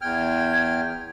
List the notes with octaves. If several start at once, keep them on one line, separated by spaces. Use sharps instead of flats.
E2 G5 F6 G#6